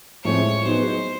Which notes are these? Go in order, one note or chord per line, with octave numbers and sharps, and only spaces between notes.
A2 F3 G#3 C4 E4 C#5
F#3 B3 D#4 G#4 B4 C5